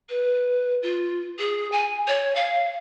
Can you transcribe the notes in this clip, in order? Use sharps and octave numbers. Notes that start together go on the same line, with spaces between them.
B4
F4
G#4
G#5
C#5
F5